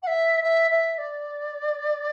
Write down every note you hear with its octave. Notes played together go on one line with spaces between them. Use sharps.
F#5
E5
E5
E5
D5